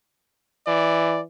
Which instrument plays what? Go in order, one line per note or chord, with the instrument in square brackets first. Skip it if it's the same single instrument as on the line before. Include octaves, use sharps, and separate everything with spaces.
[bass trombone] E3 [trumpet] D5